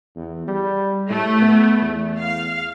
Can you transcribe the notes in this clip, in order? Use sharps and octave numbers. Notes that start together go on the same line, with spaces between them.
E2
G3
A2 A3
B3
E2
F5